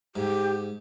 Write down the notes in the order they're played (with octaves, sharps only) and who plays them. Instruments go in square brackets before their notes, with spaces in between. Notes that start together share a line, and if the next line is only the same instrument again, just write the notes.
[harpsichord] G#2 [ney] G4